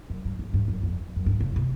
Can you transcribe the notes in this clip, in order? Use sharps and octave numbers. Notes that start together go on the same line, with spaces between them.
F#2
G2
G#2
G2
F#2
F2
F#2
G2
C#3
C3